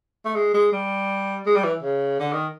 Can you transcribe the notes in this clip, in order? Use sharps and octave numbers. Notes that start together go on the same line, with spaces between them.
A3
G#3
G#3
G3
G#3
G3
E3
C#3
D3
D#3